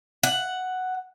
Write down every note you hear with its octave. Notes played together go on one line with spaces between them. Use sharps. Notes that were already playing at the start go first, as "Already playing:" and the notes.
F#5